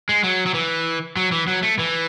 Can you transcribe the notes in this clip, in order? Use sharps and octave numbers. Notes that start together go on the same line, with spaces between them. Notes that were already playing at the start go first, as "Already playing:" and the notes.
G#3
F#3
F#3
E3
F#3
E3
F#3
A3
E3